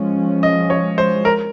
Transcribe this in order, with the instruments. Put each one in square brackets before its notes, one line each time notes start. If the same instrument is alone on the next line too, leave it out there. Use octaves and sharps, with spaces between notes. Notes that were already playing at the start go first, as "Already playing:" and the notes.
Already playing: [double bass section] F3 G#3 C#4
[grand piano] D#5
C#5
C5
A#4